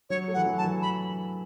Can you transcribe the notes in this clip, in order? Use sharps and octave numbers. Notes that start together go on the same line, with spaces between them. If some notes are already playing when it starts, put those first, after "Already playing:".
F#3 C#5
A3
F#5
E3
F#3
A5
E3
B5